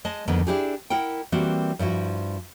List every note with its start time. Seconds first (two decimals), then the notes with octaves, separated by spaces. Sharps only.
0.05 G#3 D#5 A5
0.28 F2 D3 D#3 A#3 B3
0.47 D4 E4 G4 G#4
0.90 E4 A#4 F#5 G5
1.32 E3 G3 A#3 C4 F#4
1.79 G2 F3 E4 F#4